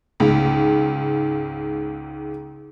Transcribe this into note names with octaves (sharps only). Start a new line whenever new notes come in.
C#2 G#2